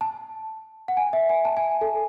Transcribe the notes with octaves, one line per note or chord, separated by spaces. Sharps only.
A5
F#5
G#5
E5
G#5
A5
G#5
A4